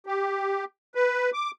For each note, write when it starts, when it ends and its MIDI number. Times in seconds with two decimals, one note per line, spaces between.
0.06 0.65 67
0.95 1.30 71
1.34 1.51 86